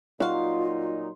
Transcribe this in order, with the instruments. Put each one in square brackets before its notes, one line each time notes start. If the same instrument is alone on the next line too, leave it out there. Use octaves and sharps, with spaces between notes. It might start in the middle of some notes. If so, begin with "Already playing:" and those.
[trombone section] A#2 F#3 D#4 [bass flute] F4 [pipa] F#4 F5 [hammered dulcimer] C6